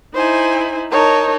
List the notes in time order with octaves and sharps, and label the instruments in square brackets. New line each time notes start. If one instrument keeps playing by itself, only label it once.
[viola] D#4 E4 [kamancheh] C5 G#5
[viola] D#4 A#4 [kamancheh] C#5 A5